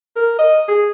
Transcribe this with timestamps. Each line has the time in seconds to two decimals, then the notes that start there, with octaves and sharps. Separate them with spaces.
0.16 A#4
0.39 D#5
0.68 G#4